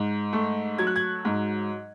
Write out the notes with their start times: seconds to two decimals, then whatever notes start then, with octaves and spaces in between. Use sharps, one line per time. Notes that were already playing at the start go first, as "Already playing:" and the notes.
Already playing: G#2
0.33 A3
0.78 F#3 G#6
0.87 F#6
0.96 G#6
1.25 G#2